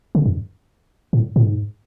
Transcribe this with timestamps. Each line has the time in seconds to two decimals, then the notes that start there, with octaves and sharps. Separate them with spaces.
0.15 C#3
0.26 F#2
1.13 A2
1.36 A2
1.45 G#2